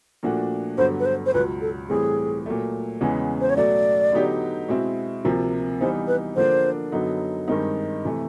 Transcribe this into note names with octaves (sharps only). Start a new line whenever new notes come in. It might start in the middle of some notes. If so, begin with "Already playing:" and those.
A#2 F3 A3 D4 F#4
G2 D3 F#3 B3 C5
B4
C5
C5
C#2 B2 F#3 B4
A4
A2 E3 G3 C4 G#4
A#2 F#3 A3
E2 C#3 E3 G#3 B3
C5
C#5
B2 F#3 A3 D5
D3 F#3 B3 D#4 G4
B2 G#3 C4 E4
D2 C3 F3 A#3
E3 G3 B3 D#4 C5
B4
D3 F3 A#3 D4 C5
F#2 D3 F#3 B3 D#4
G2 D#3 G#3 C4 D#4
C3 E3 A3